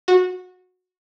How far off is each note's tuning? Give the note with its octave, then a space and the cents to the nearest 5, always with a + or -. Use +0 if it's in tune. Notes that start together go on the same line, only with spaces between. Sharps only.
F#4 -20